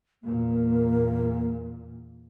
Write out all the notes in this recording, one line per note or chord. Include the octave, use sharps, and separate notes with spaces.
E2 A#2 A#3